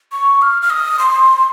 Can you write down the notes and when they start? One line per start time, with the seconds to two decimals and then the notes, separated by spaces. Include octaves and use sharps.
0.12 C#6
0.42 F6
0.62 F6
0.70 D#6
0.99 C6